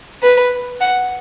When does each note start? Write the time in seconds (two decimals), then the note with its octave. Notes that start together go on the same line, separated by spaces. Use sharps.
0.23 B4
0.81 F#5